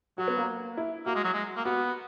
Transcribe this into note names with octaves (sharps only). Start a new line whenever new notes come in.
F#3 F#4
B3
A#3
E4
A#3 F#4
G#3
F#3
G#3
A#3
B3 F#4